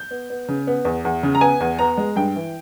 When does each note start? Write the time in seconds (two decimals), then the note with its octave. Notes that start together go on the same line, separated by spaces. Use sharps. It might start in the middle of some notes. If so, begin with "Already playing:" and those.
Already playing: G6
0.11 B3
0.30 B3
0.48 C#3
0.67 B3
0.85 E2
1.05 E2
1.23 C#3
1.35 A#5
1.41 B3 G#5
1.60 E2
1.79 B3 A#5
1.97 G#3
2.16 G2 G5
2.36 E3